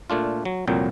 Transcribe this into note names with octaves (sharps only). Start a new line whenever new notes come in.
A#2 A3 D4 F4
F#3
C2 F2 A#2 F#3 G5